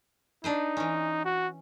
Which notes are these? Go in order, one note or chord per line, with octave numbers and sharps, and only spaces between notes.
D4 D#4 B4 C5
E3 C#4
F#4